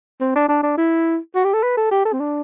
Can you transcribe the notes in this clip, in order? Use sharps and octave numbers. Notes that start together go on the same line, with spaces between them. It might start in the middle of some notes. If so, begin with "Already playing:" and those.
C4
D4
D4
D4
E4
F#4
G4
A4
B4
A4
G4
A4
C4
D4